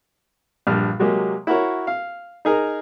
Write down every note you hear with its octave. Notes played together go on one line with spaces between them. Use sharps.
A#1 G2 F6
C3 F#3 G#3 A#3 G4
E4 F#4 A#4 C#5
F5
D#4 G#4 A#4